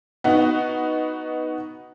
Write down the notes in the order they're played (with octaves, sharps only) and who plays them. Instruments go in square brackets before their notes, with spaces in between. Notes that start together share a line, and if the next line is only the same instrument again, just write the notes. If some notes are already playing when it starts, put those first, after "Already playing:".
[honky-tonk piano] B3 D#4 F#4